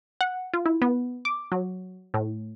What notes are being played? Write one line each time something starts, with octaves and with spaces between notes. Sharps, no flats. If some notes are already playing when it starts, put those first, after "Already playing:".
F#5
F4
E4
B3
D6
F#3
A2